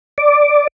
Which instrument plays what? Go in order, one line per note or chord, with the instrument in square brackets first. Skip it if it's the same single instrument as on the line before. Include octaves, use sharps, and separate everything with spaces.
[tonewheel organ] D5